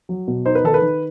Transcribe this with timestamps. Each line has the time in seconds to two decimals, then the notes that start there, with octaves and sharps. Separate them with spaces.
0.09 F#3
0.28 B2
0.45 D#4 C5
0.55 B4
0.64 D#3 A4
0.74 B4
0.82 D#3